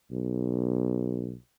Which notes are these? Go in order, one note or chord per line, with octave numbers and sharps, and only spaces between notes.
B1